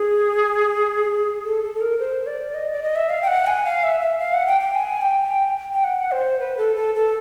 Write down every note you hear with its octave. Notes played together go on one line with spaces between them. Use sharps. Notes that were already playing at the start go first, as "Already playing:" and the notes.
Already playing: G#4
A4
A4
A4
A#4
C5
D5
D#5
D5
D#5
E5
F5
G5
F#5
G#5
F5
E5
E5
F5
F#5
G5
G5
G#5
G5
G5
F#5
C5
B4
A4
A4
A4